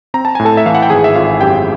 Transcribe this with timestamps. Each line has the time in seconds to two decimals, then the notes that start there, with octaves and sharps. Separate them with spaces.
0.14 C4 A#5
0.25 A5
0.35 A2 G#5
0.45 A4 A5
0.57 E5
0.66 E3 F5
0.75 F#5
0.82 G5
0.90 G#1 G#4 G#5
1.04 E5
1.15 G#1 F4 F5
1.41 F#2 G4 G5